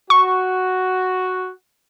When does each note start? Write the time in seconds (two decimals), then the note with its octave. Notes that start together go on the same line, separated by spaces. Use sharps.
0.10 F#4 C#6